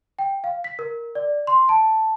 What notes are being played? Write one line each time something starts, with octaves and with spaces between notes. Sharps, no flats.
G5
F5
B6
A#4
D5
C6
A5